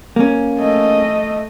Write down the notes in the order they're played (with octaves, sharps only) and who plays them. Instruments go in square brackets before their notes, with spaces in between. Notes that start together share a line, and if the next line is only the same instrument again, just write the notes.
[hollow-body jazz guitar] A#3 C#4
[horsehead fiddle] A3 D#5